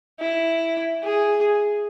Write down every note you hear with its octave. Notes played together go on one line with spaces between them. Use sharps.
E4
G#4